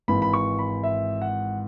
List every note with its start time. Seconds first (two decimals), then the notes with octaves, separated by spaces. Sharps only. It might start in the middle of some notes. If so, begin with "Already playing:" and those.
0.08 G#1 G#2 E3 B5
0.22 B5
0.33 C#6
0.59 B5
0.83 E5
1.22 F#5